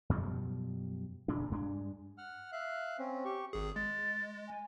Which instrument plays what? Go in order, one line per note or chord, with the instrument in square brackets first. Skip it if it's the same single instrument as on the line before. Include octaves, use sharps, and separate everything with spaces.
[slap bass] F#2 B2 F3 G3
E1 A#2 C#3 D4
G2 G#3 B3 D4
[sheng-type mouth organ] F#5 F6
E5 F5 F#6
C4 C#4
G4 C#6
[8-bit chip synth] G#1 G#4
[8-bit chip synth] G#3 [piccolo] A6
[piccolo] G#5